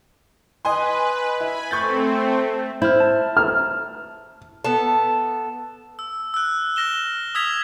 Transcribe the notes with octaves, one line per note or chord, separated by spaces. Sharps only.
B4 D#5 G#5 C6
E4 G#5 B5
A3 C4 C#6 G6 A6
E4 C5 F6
A5
F6
B3 A4
E6
E6 F#6
F6 A#6 E7 G7
D#6 E6 G#6 B6 F7